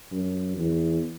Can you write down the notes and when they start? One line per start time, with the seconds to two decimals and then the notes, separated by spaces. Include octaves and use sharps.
0.12 F#2
0.57 E2